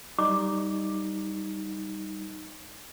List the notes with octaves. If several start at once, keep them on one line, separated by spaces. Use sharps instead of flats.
G3 D#4 D6